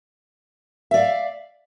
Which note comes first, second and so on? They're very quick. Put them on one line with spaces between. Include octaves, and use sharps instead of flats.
E5 D5 F5